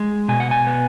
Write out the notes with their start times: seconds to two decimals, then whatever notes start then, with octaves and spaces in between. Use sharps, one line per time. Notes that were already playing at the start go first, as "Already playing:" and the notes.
Already playing: G#3
0.28 B2 G#5
0.40 F#5
0.51 G#5
0.67 B3